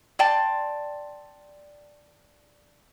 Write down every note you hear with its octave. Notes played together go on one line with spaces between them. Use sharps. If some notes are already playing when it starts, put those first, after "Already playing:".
D5 G5 A5 C6